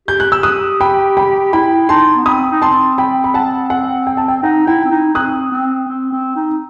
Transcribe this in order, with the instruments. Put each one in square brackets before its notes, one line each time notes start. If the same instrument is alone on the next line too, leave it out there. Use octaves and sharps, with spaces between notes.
[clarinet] G4 [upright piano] G6
[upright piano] F#6
E6
D#6 F#6
G5 B5
G5 B5
[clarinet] E4 [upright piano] G5 B5
[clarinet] D#4 [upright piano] A5 C6
[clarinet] B3
[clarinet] C4 [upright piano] B5 D#6
[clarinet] D#4
[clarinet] C4 [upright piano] A5 C6
[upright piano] G5 B5
B5
F#5 A5
F#5
G5
A5
G5
[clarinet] D#4 [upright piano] F#5
[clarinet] E4 [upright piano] G5
[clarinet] C4
D#4
[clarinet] C4 [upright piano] D#6 F#6
[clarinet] C4
C4
C4
D#4